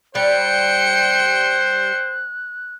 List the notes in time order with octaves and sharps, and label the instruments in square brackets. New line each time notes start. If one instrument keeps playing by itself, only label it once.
[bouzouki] G3 [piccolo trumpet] C5 [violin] G5 C#7 [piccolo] F#6